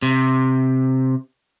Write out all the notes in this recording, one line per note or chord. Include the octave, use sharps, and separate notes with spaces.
C3